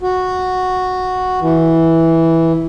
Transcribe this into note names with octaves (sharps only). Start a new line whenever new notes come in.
F#4
E3